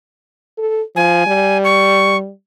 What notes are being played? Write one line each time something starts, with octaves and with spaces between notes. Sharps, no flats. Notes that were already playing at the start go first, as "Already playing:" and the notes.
A4
F3 G#5
G3
C#6